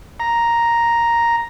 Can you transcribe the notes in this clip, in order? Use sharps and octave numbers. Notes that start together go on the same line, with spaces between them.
A#5